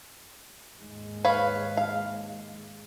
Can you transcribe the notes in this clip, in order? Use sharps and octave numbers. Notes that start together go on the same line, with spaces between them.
D#2 G#2 G#3
B4 C#5 F5
F5